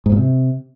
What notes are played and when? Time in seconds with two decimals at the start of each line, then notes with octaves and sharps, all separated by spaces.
0.06 G#2
0.12 A#2
0.18 C3